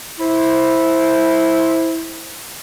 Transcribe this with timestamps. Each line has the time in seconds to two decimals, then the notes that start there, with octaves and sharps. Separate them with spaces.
0.20 E4 C5